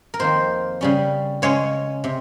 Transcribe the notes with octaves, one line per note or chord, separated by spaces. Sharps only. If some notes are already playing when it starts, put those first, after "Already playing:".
A#4
F2 D#3 A#3 C5
C#3 G3 C#4
C#3 G#3 C#4 C#5
C3